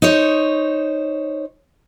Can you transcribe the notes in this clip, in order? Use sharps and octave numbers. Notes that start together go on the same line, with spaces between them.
D#4 C5 C#5